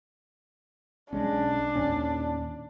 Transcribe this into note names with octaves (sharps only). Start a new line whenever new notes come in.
B1 G#3 C#4 D4
D#2 A#2 C#4